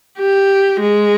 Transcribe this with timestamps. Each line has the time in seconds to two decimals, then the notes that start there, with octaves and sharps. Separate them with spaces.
0.18 G4
0.80 G#3